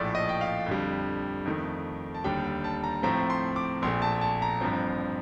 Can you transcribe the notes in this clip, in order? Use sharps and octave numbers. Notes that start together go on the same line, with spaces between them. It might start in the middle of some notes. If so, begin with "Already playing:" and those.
Already playing: A#1 A2 F3 A3 D5
D#5
G5
F5
F2 D3 G3
F2 D#3 A3
A5
D#2 D3 G3 D4 G5
G5
A5
A#5
A2 F3 A3 C4 A#5
C6
D6
A#1 A#2 A3 C6
A5
A5
A#5
A1 G2 F3 C4